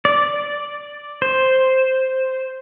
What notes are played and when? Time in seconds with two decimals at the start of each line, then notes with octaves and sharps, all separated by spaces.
0.05 D5
1.22 C5